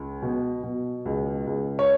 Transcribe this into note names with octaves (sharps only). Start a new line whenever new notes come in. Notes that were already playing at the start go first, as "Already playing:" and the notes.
Already playing: C#2
B2
B2
C#2
C#2
C#5